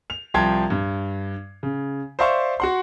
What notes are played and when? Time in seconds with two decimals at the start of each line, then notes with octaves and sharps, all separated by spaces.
0.10 F7
0.34 C2 F3 G5 A5 C6 G#6
0.70 G2
1.63 C#3
2.19 C5 D5 E5 F5 C6 C#6
2.60 F#4 F#5 C6